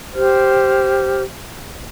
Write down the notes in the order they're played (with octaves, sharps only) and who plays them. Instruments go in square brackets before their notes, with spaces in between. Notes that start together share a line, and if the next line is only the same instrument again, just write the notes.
[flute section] G4 C5 F6